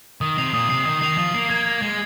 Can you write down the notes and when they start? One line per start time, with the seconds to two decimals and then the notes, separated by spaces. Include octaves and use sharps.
0.21 D#3 D#6
0.38 C3 C7 F7
0.54 A#2 D#6
0.70 C3 C7 F7
0.86 D#3 D#6
1.01 D#3 C7 F7
1.18 F3 D#6
1.34 A#3 C7 F7
1.49 A#3 G#6
1.67 F7
1.82 G#3 G#6